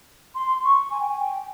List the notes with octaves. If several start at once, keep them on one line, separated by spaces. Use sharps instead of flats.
C6
C#6
G#5
G5
G#5
G5